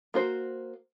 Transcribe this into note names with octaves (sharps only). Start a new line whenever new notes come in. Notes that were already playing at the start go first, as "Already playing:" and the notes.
A#3 F#4 C5